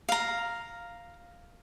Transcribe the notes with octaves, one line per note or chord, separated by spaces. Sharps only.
F5 A#5